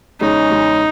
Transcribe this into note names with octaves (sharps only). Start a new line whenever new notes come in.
E2 C#3 G#3 C#4 D#4
E2 C#3 G#3 C#4